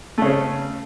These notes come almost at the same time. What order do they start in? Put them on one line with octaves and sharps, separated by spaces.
A3 C#3 C#4